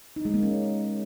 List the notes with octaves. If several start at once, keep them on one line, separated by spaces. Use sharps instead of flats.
D#4
G#3
A#3
C#4